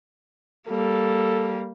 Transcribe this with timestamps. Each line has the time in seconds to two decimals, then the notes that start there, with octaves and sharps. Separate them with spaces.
0.68 G3 A#3 A4